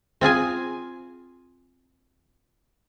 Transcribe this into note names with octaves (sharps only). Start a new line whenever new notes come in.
C4 F4 G#4 G#5